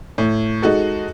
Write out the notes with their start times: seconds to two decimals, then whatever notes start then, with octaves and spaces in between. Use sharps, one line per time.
0.18 A2
0.62 G#3 D#4 F#4 A4